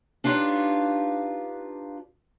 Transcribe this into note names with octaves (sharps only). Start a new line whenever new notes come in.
D4 D#4 F4 G4 B4 C#5